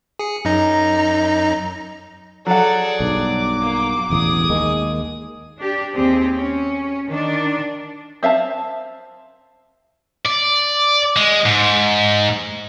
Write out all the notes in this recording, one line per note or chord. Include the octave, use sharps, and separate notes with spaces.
G#4 C#7
F#2 D#4 A#5
F#3 G#4 A4 D5 F#5
B1 G2 D6
A#3
E1 A1 E2 G#4 D#6
D#2 G#3 A#3
D4 G4
D#2 C4 G4 G#4
C#4
D#3 D4
C4 E5 F5 A5
D5
G#3
G#2